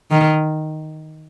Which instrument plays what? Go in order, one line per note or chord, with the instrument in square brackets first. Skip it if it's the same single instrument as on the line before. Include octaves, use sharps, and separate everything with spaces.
[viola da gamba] D#3